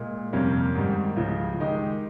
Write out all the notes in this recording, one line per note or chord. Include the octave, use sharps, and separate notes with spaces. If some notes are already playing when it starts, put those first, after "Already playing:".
Already playing: A#2 G#3
F2 C3 G3 A#3 C#4
G#2 D#3 G3
C#2 C#3 F3
D#3 G#3 D#4 G4